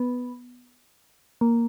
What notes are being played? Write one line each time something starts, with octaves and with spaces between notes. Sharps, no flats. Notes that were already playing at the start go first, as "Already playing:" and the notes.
Already playing: B3
A#3